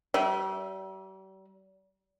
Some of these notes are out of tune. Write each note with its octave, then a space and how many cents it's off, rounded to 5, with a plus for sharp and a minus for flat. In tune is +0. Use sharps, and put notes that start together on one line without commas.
G3 -40 E5 +0